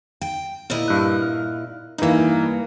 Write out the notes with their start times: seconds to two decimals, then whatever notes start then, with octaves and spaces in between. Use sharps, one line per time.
0.21 G5
0.70 A#2 E4 D#5
0.88 G2 F#6
1.22 F6
1.98 G2 E3 A#3 D#4